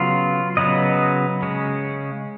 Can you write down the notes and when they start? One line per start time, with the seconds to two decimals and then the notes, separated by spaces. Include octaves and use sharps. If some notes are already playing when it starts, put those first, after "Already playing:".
Already playing: C#3 F#3 B3 F4
0.57 C#3 F#3 B3 D#5
1.42 C#3 G#3 C#4